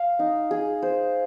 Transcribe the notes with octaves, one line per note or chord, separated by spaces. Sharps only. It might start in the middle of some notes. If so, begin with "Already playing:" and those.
Already playing: F5
D#4
G#4
C5